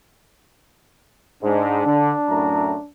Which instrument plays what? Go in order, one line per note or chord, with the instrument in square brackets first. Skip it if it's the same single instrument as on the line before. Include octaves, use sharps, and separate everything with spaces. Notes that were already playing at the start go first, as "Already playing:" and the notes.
[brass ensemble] G#2 [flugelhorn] D4
[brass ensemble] D3
F#2 A2 A#5